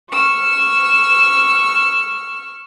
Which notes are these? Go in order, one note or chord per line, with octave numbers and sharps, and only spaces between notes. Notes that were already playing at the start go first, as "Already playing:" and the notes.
C#6 E6 F6